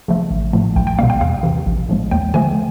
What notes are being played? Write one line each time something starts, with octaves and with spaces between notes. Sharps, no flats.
C#3 F3 A3
A1
A2 F3 A3
B1 G5
G5
B2 G3 A#3 F5
G5
E2 F5
C3 E3
A#1
A2 F3 G#3
D#2 G5
D3 F3 A3 G#5